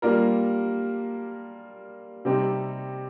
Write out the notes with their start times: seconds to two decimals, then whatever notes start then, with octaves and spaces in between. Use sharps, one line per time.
0.02 G3 A#3 D4 F4 A#4
2.25 C3 G3 C4 D#4 G4